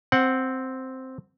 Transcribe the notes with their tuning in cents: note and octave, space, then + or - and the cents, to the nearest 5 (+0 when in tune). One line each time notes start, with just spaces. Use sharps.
C4 +0 F#5 +0